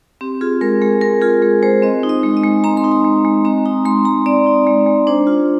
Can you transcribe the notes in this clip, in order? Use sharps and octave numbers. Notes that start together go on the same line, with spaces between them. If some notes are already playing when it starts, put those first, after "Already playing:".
C4 G4
F4 G#4
G#3 A#4
G#3 G#4
C4 A#4
F4 G#4
G#3 G#4
G#3 C5
C4 D#5
D#4
D#5
G#3
D#5
G#3
C4 A#5
C6
D#4
A#5
G#3
G#3
C4 A#5
D#4 A#5
G#3 C6
G#3 A#5
C4 D5
D#4
G#3
G#3
D4 C5
F4